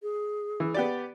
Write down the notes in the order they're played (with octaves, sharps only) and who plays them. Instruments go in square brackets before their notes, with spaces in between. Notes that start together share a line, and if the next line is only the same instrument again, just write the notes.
[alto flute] G#4
[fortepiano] E3
B3 G4 D5